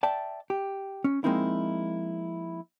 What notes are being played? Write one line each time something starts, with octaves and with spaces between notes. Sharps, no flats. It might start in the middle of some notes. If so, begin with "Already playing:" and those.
D5 E5 G5 A5
G4
C#4
F3 G#3 A#3 C4 D#4 E4